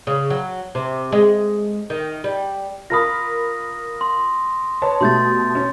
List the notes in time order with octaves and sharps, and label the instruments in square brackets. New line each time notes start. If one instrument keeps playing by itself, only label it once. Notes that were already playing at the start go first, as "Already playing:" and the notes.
[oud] C#3
F#3
C3
G#3
D#3
G3
[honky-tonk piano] F4 A#4 B5 [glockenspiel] D#6 A#6
[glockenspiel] C6
[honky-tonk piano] B4 C#5 A5
[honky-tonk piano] B2 G3 A3 [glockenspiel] C6 G6 A6
[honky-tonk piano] C#4